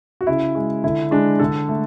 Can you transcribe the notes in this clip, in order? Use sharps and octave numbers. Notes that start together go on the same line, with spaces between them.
F#4
C#3 E4
G#3
D3 E4
G#3 D4
D3 A4
A3